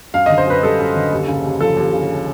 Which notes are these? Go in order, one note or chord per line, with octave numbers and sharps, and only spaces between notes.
F#2 F5
D3 D#5
C5
F#2 B4
G3 A4
F#2
D3
D#2
C#3
D#2
F3 A4
D#2
C#3